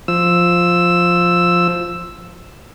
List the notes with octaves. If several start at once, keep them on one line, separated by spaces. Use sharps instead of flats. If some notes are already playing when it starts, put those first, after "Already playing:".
F3 E6